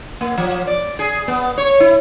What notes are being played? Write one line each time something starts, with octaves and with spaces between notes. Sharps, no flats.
A#3
F3
D5
G#4
B3
C#5
E4